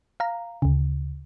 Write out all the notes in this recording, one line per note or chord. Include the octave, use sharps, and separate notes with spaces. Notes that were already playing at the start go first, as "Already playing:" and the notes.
F5 A#5
D2 C#3